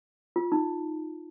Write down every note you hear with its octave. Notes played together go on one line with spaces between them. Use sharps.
F4
D#4